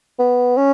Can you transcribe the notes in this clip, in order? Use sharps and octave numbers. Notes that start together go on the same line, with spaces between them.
B3
C#4